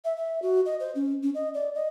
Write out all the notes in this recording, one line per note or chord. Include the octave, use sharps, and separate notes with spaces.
E5
E5
F#4
D#5
C5
C#4
C#4
D#5
D5
D#5